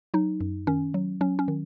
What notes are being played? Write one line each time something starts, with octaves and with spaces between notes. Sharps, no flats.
F#3 D#4
F#2
D#3 C#4
F#3
F#3 C#4
C#4
D#3